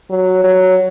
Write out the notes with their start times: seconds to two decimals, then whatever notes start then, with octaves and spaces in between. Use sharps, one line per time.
0.10 F#3
0.44 F#3